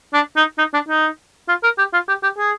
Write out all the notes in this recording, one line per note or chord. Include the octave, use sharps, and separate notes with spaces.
D4
D#4
D#4
D4
D#4
F4
A#4
G4
F4
G4
G4
G#4